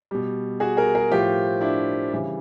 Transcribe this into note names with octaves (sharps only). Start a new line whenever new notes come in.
B2 G3
F#4 G#4
G#4 A#4
G#4 A#4
A2 F3 F4 G4
D4 E4
C#3 E3 G3